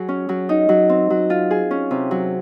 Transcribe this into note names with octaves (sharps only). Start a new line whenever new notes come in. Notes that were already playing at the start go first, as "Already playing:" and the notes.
Already playing: F#3 G#4
C#4
F#3
D#4
F#3
C4
F#3
F4
G#4
C#4
C3
F#3